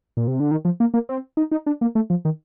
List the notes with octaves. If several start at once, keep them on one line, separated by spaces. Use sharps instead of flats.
A#2
C3
D3
D#3
F3
A#3
A#3
C4
D#4
D#4
D4
A#3
A3
F3
D#3